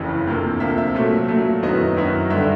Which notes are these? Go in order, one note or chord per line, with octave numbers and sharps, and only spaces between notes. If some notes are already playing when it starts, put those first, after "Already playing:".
Already playing: F#1 F2 C#3 E3
D2 C3 F3 A#3
D2 C3 F3 A#3 E5
E5
A#2 F#3 A3
A#2 F#3 A3
F#2 D#3 F#3 B3 E4 D#5
F#2 D#3 F#3 B3 E4
G2 D3 G3 E5